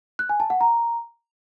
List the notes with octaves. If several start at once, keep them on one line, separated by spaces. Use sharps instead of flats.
F#6
G#5
A5
F#5
A#5